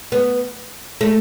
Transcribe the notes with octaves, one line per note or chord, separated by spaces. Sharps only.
B3
A3